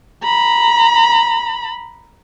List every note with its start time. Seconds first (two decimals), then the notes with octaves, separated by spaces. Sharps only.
0.23 A#5 B5